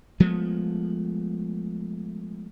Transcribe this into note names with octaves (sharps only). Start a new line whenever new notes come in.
F3 G#3 A3 B3